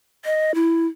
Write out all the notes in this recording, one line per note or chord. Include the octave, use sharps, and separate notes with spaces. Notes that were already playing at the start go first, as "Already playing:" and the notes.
D#5
E4